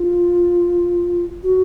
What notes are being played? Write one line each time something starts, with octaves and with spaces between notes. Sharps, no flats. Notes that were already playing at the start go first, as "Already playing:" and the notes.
Already playing: F4
F#4